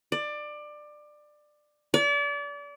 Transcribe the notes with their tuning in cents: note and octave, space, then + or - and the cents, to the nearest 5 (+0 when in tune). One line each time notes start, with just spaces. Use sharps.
D5 +20
D5 -35